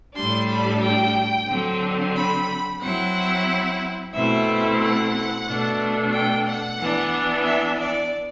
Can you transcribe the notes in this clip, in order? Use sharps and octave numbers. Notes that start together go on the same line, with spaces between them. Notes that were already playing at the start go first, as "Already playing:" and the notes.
A2 G3 D4 C6
B5
G5
D3 F#3 C4
B5
F#3 C4 E4 F#5
B2 A3 C4 E4 E5
F#5
B2 A3 D4
G5
F#5
E3 B3 D4
E5
D5